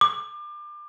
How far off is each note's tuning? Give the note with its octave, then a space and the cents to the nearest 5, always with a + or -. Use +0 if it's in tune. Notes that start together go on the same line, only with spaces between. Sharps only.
D6 +30